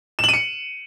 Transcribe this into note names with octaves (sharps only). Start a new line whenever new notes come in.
C#7 D#7 E7 F#7